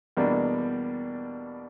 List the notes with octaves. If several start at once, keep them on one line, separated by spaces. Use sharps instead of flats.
E2 B2 G3 A#3 D4